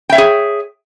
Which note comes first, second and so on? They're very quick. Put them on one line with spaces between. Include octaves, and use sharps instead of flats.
G5 E5 C#5 G#4